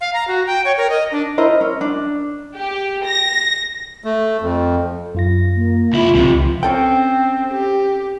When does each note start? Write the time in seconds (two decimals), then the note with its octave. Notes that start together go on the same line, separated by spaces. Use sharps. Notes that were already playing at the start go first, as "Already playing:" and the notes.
0.01 F5
0.14 A#5
0.28 F#4
0.47 G5
0.65 C#5
0.77 A#4
0.90 D#5
1.12 D4
1.38 E4 A#4 C5 D#5
1.61 C#4
1.81 D4
2.56 G4
3.06 A#6
4.04 A3
4.41 F2
5.14 F#2 F4 A#6
5.56 A#3
5.93 C#2 E4 F4
6.15 C#2 C3 F3
6.63 C4 C#4 A4 G5
7.52 G4